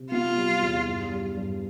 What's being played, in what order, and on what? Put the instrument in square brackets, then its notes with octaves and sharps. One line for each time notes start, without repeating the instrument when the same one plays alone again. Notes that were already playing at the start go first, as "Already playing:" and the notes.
Already playing: [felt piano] C3
[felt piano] B3 [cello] F4
[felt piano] G3
E2
G2
G3
G2